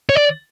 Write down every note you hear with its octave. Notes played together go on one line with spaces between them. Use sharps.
C#5
D5